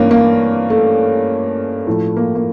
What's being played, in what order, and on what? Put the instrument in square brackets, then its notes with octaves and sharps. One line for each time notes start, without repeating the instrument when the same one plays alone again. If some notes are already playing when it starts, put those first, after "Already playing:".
Already playing: [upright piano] G2 E3 A#3 C#4
A#3
A3
A2 F3 A3
A#3
A#3